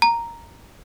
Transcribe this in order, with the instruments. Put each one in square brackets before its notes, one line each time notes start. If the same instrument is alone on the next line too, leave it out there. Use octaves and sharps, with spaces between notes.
[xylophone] A#5